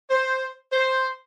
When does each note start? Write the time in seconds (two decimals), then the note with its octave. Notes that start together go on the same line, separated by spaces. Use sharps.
0.10 C5
0.73 C5